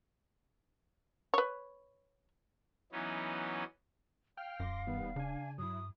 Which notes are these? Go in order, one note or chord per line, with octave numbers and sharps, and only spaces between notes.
B4 C#5
E3 F#3 B3 C#4 D#4
F5 G5 F6
D#1 F#2 C6 D6 A#6
D#3 G3 B3
C#3 D4 G#5
G2 F#3 E4 D#6